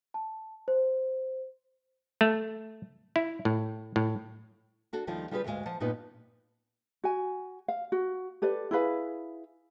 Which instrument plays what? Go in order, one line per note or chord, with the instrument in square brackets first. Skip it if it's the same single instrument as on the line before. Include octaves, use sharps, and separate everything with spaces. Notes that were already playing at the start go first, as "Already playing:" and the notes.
[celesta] A5
C5
[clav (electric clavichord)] A3
E4
A2
A2
[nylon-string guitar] D4 F#4 A4
D#2 D#3 F3 G3 F4
G3 F4 G4 G#4 A#4 B4
D2 G#2 B2 G#3 F5
F3 F#5 A5
G2 A#2 B3 D#4 F4 B4
[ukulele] F#4 G#5
F5
F#4
G4 A4 B4 D5
E4 G#4 B4 F5